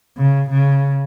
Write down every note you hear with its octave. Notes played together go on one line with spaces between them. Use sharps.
C#3
C#3